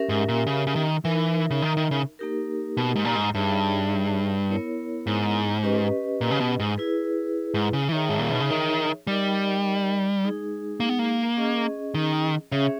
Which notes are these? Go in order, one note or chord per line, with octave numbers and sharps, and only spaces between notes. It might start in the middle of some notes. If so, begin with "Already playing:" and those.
Already playing: C#4 G4 A#4 E5
G#2
A#2
C#3
C#3
D#3
E3 D#4 A#4 E5
C#3
D#3
D#3
C#3
A#3 D#4 G4 A#4
B2
G#2
A#2
G#2
G2 D#4 G#4 C#5 E5
B3 E4 A#4 C#5
G#2
C#4 G4 B4 D#5
A#2
C#3
B2
G#2
E4 G#4 B4
G#2
C#3
E3
D#3 D#4 G#4 C#5 E5
G#2
A#2
B2
C#3
D#3
G3 D#4 A#4 D#5
G#3 D#4 G#4
A#3
B3
A#3
C#4 G#4 D#5
D#3
C#3 C#4 G#4 C#5 E5